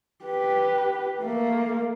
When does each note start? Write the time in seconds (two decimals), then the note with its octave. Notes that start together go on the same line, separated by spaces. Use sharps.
0.25 G4 B4
1.20 A3 A#3